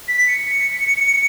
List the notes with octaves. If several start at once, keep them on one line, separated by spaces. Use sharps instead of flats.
B6
C#7